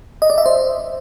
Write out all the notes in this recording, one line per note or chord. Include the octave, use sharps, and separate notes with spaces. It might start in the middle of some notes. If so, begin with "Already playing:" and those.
D#5
D5
E5
C5